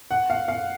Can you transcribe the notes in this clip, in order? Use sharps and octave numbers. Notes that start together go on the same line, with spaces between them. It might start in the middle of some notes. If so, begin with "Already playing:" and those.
F#5
F5
F5